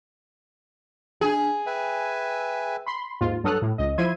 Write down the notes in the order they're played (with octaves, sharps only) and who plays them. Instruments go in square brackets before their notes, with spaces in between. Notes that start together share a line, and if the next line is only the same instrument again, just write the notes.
[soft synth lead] D4 [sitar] G#4
[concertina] B4 E5 G#5 [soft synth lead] G5
[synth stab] B5 C6
D#2 G#2 F4
G2 F#3 A4 D#6 F6 F#6
A2
C#2 D#5
F3 E4 E5 C6 G#6 D#7